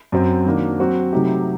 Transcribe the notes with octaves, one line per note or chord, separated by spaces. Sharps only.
F#2 F#3 C4
D#3 F#3 A#3 D4
F#3 C4 F#4
C3 F#3 A3 D#4 G4